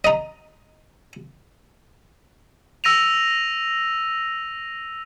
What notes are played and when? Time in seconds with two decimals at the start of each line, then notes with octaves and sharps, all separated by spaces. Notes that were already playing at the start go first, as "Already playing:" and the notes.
0.05 D#5 A#5
2.84 E6 A#6 D#7 F7